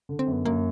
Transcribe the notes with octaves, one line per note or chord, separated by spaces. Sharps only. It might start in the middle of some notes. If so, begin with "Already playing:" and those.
D3
C4
F#2
B3
F#2 A#3